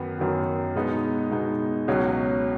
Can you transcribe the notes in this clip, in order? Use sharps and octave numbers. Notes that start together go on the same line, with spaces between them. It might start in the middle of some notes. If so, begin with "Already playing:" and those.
Already playing: F#2 D#3 F#3 B3 F#4
F#2 D#3 F#3 B3 F#4
B2 G#3 B3 D#4
B2 G#3 B3 D#4
C#2 B2 F#3 C#4 F#4